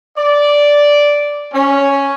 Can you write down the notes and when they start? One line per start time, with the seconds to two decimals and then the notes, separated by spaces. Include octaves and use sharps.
0.17 D5
1.53 C#4